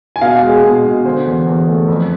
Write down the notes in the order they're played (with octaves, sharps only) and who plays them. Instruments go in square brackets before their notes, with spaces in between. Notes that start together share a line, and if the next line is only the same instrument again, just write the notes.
[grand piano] G#5
B2 F5
G#3
G#4
B2
B2
D3 C5
E2
E2
A3
F2